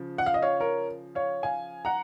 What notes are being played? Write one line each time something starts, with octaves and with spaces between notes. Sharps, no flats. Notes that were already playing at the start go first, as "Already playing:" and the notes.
Already playing: C#3 F3
F#5
F5
D#5
C#5 F5
A#4 C#5
C#5 F5
F5 G#5
F#5 A#5